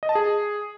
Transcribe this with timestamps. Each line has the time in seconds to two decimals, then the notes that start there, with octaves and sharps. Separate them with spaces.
0.03 D#5
0.09 A5
0.15 G#4